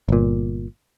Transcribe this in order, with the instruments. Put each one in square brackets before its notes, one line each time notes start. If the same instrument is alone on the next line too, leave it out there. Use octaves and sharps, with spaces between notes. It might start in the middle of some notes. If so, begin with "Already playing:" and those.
[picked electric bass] G1 A#2